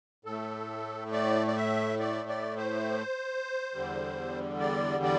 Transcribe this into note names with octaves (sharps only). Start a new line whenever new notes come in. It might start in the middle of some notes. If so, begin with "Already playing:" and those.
A2 A3 A4
D5
D5
E5
D5
D5
C5
E2 D3 G3
D5
D5